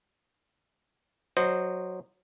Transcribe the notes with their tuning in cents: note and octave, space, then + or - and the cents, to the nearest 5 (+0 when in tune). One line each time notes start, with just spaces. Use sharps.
F#3 +0 C5 +0 D#5 -20